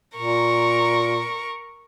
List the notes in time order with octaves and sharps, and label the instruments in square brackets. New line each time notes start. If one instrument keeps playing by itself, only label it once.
[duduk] A#2 [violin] A#4 C#6